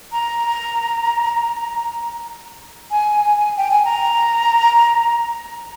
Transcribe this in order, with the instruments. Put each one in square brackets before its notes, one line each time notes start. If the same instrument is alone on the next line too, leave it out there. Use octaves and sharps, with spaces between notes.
[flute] A#5
G#5
G5
G#5
A#5